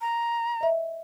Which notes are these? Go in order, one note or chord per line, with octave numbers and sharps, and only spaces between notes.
A#5
D#5 E5